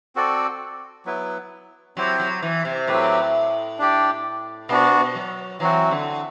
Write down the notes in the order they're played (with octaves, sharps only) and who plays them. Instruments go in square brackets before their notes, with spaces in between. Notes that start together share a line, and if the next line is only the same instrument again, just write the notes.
[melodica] C4 F#4 A4 D5
F#3 B3 E4 B4
[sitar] F#3 [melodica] C4 E4 G4 C5
[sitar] F#3
E3
C3
[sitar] A2 [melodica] F#3 C4 G4 B4
[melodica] D4 G4 D5
[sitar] B2 [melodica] B3 D4 F#4
[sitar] F#3
[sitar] E3 [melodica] F#3 C4 F#4
[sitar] D3